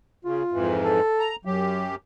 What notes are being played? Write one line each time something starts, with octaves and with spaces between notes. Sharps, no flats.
C#3 F4
F2 G#2 E3
A4
A#5
F#2 F#3 G4